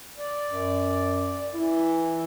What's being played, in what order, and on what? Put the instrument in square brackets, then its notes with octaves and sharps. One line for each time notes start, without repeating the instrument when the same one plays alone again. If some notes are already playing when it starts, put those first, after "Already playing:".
[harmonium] D5
[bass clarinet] F#2
[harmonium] E3 [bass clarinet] E4